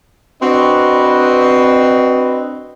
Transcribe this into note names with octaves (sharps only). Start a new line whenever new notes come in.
C4 D4 F#4 B4 D#5